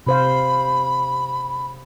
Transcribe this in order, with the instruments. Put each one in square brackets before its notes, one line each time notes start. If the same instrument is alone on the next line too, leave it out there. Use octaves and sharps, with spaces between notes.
[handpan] C3 C5 F5 [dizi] B5